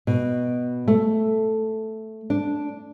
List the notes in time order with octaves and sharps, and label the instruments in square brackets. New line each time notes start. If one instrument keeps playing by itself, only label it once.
[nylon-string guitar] B2
A3
D4